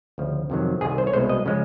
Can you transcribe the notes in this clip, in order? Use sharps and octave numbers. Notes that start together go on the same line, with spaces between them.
D2 C#3 F3
F2 C3 D#3 F#3
C2 C3 D#3 G#4
C5
C#5
C2 B2 G#3 C5
D#5
C#3 F3 G#3